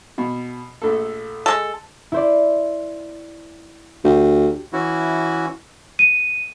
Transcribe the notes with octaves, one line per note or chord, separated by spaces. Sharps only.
B2
A#1 A3 A4
G#3 A4
E4 C5 D5
D2 G4
E3 C#4 E4 F#4
D#7